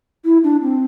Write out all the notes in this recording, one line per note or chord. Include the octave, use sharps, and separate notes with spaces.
E4
D4
C4